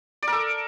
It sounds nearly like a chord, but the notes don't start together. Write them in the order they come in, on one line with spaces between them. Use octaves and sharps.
D5 A#4 A4